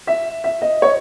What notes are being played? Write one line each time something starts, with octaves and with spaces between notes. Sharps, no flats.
E5
E5
D#5
C#5